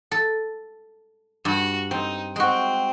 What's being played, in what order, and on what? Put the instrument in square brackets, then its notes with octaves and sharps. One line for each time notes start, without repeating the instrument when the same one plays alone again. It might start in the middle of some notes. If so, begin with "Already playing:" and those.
[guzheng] A4
[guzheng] G2 [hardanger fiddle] F#4
[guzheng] C4 [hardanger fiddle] D#4
[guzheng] G#3 F#4 [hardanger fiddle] C4 G5